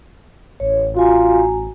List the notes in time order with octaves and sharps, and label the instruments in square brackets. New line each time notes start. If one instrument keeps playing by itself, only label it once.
[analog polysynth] A1 [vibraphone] C#5
[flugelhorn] F4 [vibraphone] F#4 G#5 A#5